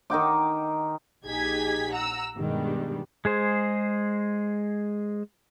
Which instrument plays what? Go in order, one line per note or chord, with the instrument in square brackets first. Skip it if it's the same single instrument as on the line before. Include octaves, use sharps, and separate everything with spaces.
[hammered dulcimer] D#3 D#4 G5 D6
[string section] A#1 D#4 G4 G#4 G#6 B6
F#5 A#5 E6
G2 B2 D#3 G3 G#3
[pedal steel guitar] G#3 G#4 C5